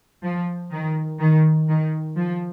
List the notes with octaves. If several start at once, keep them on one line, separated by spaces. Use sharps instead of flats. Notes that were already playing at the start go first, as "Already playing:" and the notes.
F3
D#3
D#3
D#3
F3